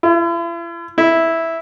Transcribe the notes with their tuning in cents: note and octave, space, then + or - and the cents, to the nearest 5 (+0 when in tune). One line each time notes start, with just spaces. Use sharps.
E4 +45
E4 -5